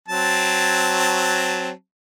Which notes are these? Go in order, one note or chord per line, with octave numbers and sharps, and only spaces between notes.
F#3 C4 A5